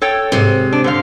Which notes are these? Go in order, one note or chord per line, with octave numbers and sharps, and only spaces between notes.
A4 C#5 G5
G#2 C3
D4
D3 C5 F5